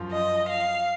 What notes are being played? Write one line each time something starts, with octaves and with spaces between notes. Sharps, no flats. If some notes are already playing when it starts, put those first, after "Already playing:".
Already playing: F#2 F3
D#5
F5